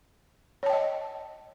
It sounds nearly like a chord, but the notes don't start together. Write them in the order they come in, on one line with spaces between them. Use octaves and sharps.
C#5 A5 G5 D#5